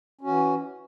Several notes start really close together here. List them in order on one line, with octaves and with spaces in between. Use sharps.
C#4 F#4 E3